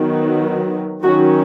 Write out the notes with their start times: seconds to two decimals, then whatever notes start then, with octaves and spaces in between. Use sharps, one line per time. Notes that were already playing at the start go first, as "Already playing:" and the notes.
Already playing: D#3 F#3 B3
1.03 D#3 F#3 C#4 D#4 F#4